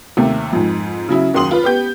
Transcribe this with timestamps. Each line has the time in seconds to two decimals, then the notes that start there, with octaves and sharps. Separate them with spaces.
0.17 D#2 C3 A3
0.53 F2 G#2
1.09 C#3 F#3 E4
1.34 F#1 D#2 F#4 C6 D#6 F#7
1.51 F4 B4
1.64 B3 G4 G6